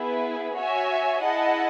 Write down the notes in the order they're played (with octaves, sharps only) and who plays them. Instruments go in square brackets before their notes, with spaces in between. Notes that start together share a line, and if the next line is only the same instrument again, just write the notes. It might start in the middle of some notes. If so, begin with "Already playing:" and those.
Already playing: [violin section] B3 E4 G#4 B4
F#4 C#5 E5 G#5
E4 G#4 D#5 F#5 A5